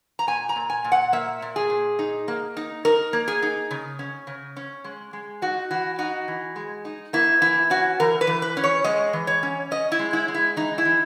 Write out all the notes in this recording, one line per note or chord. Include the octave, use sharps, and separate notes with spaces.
A#5
A#2 G#5
A#5
A#2
G#5
A#2
F#5
A#3 E5
A#2
G#4
A#2
D#4
A#3
D#4
D#4 A#4
A#3
G#4
D#4
C#3
C#4
C#3
C#4
G#3
G#3
D#4 F#4
E3 F#4
D#4 F#4
E3
G#3
D#4
A#3 E4
E3 E4
C#4 F#4
E3 A#4
B4
E3
B4
C#4
C#5
G#3 D#5
E3
C#5
C#4
C#4 D#5
E4
G#3
E4
G#3
E4
E3 D#4
E4
E3